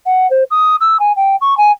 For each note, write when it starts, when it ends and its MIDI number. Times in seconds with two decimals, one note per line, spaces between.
0.06 0.27 78
0.30 0.44 72
0.51 0.76 87
0.81 0.97 88
1.00 1.12 80
1.16 1.36 79
1.41 1.57 85
1.57 1.71 80